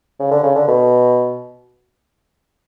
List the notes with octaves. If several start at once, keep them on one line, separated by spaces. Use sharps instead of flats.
C#3
D3
C#3
D3
B2